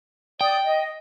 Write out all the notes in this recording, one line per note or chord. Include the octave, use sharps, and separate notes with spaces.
D5 G5 D#6
D#5